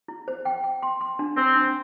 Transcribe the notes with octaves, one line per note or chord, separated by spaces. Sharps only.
E4
C5
G5
G5
C6
C6
D4
C4 C5
D4